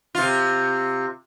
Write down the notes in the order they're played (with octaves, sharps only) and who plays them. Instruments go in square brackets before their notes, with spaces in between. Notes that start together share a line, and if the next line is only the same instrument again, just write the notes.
[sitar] C3 F4